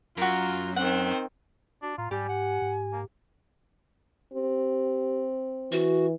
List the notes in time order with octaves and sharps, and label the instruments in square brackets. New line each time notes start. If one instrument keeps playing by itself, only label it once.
[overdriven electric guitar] F#2 [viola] F4 [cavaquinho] F#4 A#4
[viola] D#3 C4 [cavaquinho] F#5
[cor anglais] D4 [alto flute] F#4
[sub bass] A2 [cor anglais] F4 [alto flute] A#5
[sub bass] G#2 [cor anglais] G3 [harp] G4 [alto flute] G#5
[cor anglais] F#5
[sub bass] G#2
[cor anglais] A#3
[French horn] C4 [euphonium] G4
[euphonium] E3 [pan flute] F#4